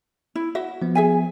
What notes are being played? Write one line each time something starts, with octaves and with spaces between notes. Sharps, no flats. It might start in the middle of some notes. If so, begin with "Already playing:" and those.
E4
F#4 E5
F3 B3
G#4 E5 G#5